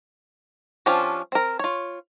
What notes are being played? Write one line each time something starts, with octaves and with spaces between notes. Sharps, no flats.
F3 C#4 D4 F4 G4
C4 A#4
F4 C#5